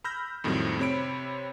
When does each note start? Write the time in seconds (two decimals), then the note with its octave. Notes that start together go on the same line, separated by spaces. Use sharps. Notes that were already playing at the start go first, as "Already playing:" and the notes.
0.04 B5 E6 F6 G6 A#6
0.44 F2 A2 D#3 F#3 G3 C4
0.79 C3 C4 C#5 B5 D7